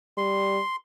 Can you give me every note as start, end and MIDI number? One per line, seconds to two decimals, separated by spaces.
0.17 0.59 55
0.17 0.76 84